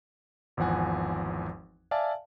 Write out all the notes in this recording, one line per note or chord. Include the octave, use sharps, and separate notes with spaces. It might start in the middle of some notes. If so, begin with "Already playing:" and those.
G#1 E2 F3 F#5 G#5
D5 E5 F5 G#5 A5